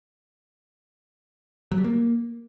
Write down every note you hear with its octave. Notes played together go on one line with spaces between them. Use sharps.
F#3
G3
A#3